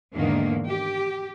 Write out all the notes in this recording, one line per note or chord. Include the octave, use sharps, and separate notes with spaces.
E2 G#2 D3 D#3 A#3
G4